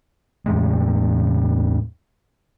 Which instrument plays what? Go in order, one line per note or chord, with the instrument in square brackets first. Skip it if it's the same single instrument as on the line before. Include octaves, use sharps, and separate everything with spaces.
[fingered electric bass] E2 A2 G#3